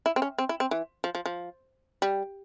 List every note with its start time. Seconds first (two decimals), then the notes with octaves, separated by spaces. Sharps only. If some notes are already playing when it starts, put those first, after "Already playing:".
0.06 E4
0.16 C4
0.22 C#4
0.38 C4
0.49 E4
0.60 C4
0.71 E3
1.04 F3
1.15 F3
1.26 F3
2.02 G3